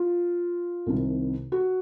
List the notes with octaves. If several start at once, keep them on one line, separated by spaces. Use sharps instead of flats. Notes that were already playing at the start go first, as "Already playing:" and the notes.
Already playing: F4
C2 C3 D#3
F#4